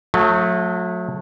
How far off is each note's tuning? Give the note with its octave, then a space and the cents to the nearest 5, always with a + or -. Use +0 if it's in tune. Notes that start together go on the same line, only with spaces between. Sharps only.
F#3 -35 A3 +0